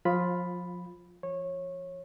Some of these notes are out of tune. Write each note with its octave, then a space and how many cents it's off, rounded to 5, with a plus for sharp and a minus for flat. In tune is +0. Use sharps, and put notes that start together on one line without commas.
F3 +30 F4 +5 B5 +0
F3 -35 C#5 -20